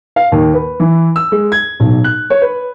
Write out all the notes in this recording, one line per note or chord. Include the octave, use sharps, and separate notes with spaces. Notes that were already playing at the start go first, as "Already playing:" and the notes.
F5
D#2
B4
E3
E6
G#3
G#6
B1
F#6
C#5
B4